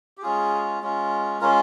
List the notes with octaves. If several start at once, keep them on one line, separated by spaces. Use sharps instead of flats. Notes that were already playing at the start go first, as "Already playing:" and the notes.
G4
G#3 C#4 F4 G#4
G#3 C#4 F4
G#3 C#4 F4 A#4